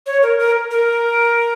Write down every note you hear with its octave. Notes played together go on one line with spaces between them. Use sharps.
C#5
A#4
A#4
A#4